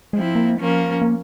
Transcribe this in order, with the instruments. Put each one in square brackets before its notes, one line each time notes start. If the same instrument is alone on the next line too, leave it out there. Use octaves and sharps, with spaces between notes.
[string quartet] F3 C4 E4 [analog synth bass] G#3
[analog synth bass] A#3
[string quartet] F3 A#3 C#4
[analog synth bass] A#3